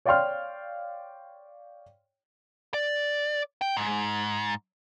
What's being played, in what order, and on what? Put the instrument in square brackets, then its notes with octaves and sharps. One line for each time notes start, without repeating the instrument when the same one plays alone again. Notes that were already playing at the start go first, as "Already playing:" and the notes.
[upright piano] C#5 D5 F5 G5 C6 F6
[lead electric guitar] D5
G5
G#2